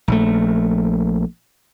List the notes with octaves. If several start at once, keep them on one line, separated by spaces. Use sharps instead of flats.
A#1 A3